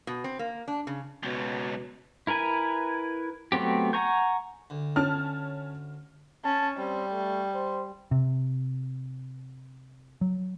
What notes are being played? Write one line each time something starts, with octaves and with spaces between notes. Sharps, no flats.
B2
C4
A#3
D4
C#3
C#2 B2 F#3
E4 A#4 B4 G#5
F#3 A3 B3 C4 G4
F#5 G#5 A#5 C#6 G6
D2
C#4 A5 F6
C#4 A5
G3 C4
A3
C5
C3
F#3